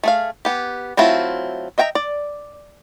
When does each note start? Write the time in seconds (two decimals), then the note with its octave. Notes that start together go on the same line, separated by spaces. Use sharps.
0.03 A3 G#4 F5
0.45 B3 G4
0.97 F#3 A3 C4 E4 F4
1.78 D#5 E5 G5 A5 A#5
1.95 D5